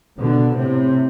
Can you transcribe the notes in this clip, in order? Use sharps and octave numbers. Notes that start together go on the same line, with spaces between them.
B2 D3
A2 C3